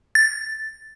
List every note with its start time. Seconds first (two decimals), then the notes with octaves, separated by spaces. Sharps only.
0.15 A6